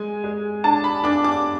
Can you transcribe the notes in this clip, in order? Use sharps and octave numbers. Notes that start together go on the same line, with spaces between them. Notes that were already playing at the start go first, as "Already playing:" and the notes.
Already playing: G#3 G#5
G#3
D4 A5
B5
D4 D6
D6